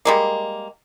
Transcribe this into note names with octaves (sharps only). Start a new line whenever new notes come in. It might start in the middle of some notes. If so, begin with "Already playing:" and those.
G3 G#3 A#3